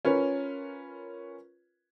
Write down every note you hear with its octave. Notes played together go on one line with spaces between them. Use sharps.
C#4 F4 A#4 B4 C#5